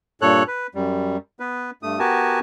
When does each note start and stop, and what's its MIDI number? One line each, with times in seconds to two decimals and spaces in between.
0.22 0.43 43
0.22 0.43 46
0.22 0.43 69
0.22 0.43 73
0.22 0.43 90
0.47 0.67 71
0.75 1.17 42
0.75 1.17 55
1.40 1.71 59
1.40 1.71 71
1.83 1.99 43
1.83 1.99 57
1.83 1.99 87
1.99 2.40 59
1.99 2.40 66
1.99 2.40 67
1.99 2.40 70
1.99 2.40 80
1.99 2.40 81